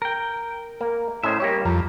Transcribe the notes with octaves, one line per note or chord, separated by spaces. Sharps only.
A#4 G5
A#3
A2 C#4 C5 D#5 E5
G3 A#3 G4 C#5
F2 A#5